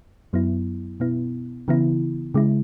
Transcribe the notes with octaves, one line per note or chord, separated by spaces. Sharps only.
F#2 F#3 B3 E4
B2 B3 E4
C#3 E3 B3 E4
C#3 G#3 E4